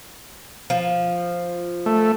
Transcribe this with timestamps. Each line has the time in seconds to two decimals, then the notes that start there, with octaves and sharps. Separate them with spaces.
0.70 F3
1.86 A3